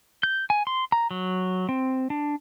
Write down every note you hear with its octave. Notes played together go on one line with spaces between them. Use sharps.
G6
G#5
C6
A#5
F#3
C4
D4